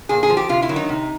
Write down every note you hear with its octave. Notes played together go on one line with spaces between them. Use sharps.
A#2 G#4
G#4
F3
G4
C3 F4
E4
D#3 F#3
D#4
C3